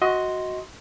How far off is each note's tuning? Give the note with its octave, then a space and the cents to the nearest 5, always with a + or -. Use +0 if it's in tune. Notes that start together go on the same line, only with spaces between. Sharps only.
F#4 +0 D#5 +20 C6 +0